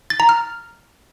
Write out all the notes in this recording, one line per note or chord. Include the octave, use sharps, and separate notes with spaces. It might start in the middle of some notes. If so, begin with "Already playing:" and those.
A6
A#5
F6